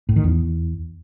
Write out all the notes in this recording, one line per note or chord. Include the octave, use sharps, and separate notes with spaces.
A2
D#3
E2